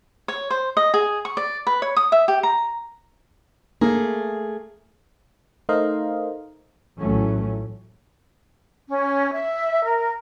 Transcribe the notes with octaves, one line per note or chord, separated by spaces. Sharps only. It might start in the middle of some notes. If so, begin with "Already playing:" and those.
C#5
C5
D#5
G#4
C#6
D5
B4
C#5
D#6
E5
G4
A#5
A3 A#3 G#4
A3 D#4 A#4 C5 D#5 F5
A#1 A2 E3 F#3 A3 C#4
C#4
E5
A#4